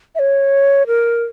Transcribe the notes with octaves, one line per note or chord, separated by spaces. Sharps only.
E5
C#5
A#4